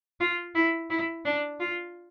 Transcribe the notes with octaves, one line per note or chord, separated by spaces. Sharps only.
F4
E4
E4
D4
F4